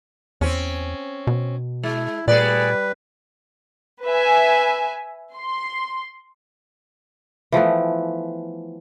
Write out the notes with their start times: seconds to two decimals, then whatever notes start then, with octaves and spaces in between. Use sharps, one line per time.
0.41 E2 C4 C#4
1.27 B2
1.83 G#3 E4
2.28 A#2 G3 A3 G#4 B4 D5
4.05 B4 E5 G#5
5.36 C6
7.52 E3 F3 A3 B3